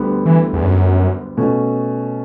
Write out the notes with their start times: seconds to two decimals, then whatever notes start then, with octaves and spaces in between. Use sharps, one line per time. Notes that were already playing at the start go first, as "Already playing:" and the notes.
Already playing: D2 D3 G3 B3
0.26 E3
0.53 E2
0.63 F#2
1.37 B2 A3 C#4